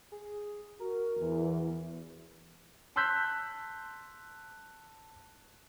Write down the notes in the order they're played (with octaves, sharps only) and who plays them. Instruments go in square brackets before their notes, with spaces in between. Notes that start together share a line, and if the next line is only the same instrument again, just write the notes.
[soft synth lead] G#4
[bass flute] F#4 [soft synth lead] A#4
[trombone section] E2 [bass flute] E3
[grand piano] A5 C6 E6 F#6 G6 B6